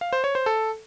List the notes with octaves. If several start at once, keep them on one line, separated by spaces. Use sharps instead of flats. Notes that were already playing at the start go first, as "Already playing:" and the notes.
F5
C5
C#5
C5
A4